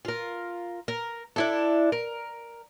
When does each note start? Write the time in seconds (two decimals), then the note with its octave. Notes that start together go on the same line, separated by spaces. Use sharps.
0.05 F4 A#4
0.88 A#4
1.36 D4 E4 A4
1.92 A#4